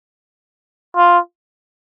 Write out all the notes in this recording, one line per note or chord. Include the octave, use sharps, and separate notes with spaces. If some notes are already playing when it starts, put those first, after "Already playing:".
F4